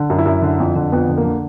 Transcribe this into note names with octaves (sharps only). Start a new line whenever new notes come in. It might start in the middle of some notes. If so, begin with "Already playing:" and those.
Already playing: D3
F#2
E4
F#2
D3
F2
D3
F2 B3
D3
A#3
D3